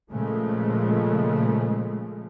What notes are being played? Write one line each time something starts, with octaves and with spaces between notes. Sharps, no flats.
A#2 C#3 F3 G#3 A3